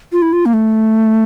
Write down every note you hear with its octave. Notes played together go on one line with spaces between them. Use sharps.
F4
E4
F4
A#3
A3